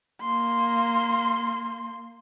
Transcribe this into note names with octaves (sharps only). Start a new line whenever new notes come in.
A#3 C6